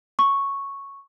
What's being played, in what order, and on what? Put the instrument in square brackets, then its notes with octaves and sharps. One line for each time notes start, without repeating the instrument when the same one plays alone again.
[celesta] C#6